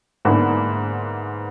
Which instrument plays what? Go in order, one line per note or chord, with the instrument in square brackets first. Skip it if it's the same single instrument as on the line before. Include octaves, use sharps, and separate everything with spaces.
[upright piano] G#2 D3 A#3 B3 D4 E4